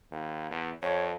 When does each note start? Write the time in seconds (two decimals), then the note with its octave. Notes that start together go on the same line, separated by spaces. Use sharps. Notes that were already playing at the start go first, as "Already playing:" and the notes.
0.11 D#2
0.51 E2
0.82 F2 C#5